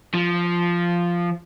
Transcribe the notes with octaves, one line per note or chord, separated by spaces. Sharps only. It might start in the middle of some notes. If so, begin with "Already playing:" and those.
F3